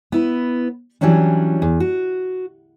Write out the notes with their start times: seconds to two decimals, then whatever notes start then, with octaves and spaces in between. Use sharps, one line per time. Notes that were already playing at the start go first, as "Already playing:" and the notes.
0.12 B3 E4 B4
1.01 E3 F#3 G3 C#4 D4
1.62 E2
1.80 F#4